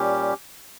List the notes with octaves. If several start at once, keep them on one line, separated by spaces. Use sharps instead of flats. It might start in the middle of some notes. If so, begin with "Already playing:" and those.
Already playing: A#2 G3 C#4 G4